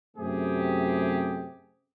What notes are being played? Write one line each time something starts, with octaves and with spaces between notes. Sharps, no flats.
F#2 C3 A3 G4 G#4